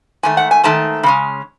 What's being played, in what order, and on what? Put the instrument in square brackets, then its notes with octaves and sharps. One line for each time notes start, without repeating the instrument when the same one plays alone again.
[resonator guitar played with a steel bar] G#2 D#3 A3 G#5
F#5
G#5
G#2 D#3 A3 A5
C#3 G#3 C#4